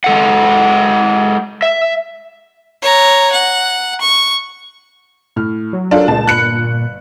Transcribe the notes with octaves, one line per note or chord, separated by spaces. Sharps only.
G#3 A4 F#5
E5
C#5 A#5
F#5
C#6
A2 F6
F#3
D4 F4 A4 A#4
C#2 A#2 G#3 A5
G1 B5 F#6 C#7